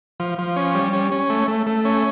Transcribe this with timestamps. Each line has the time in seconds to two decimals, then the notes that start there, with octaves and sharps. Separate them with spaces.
0.20 F3
0.38 F3
0.56 C#4
0.75 G3
0.93 C#4
1.12 C#4
1.30 A3
1.48 A3
1.67 A3
1.85 C#4